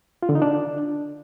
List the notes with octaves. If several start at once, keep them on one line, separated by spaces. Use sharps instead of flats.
F4
D3
D#4
D4